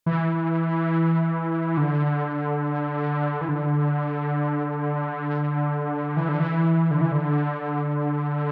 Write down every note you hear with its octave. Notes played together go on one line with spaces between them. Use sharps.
E3
D3
E3
D3
E3
D3
E3
D3
E3
D3